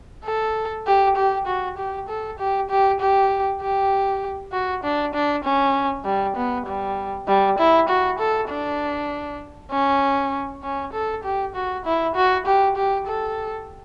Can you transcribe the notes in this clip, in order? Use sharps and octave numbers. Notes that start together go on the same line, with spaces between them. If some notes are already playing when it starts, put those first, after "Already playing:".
A4
G4
G4
F#4
G4
A4
G4
G4
G4
G4
F#4
D4
D4
C#4
G3
B3
G3
G3
E4
F#4
A4
D4
C#4
C#4
A4
G4
F#4
E4
F#4
G4
G4
A4